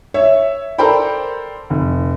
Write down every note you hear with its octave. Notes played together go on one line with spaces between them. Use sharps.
C#5 E5
A4 A#4 C5 D5 G5 B5
F1